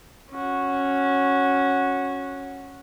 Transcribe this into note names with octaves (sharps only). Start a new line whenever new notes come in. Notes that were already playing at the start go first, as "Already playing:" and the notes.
C#4 F#4